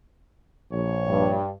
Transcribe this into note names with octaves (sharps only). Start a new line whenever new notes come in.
A#1 C#5
G2